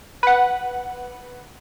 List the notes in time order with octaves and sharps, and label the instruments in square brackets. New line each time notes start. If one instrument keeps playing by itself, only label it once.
[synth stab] B4 F#5